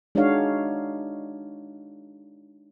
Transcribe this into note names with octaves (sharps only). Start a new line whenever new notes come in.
G#3 D4 D#4 F#4 C#5 F5